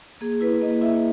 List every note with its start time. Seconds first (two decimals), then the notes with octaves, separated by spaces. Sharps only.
0.21 A#3 G#4
0.41 E4 B4
0.61 A#3 D#5
0.82 E4 E5